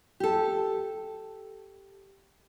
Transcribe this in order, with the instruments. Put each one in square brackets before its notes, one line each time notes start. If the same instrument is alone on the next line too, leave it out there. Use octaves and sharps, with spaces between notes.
[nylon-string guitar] G4 A4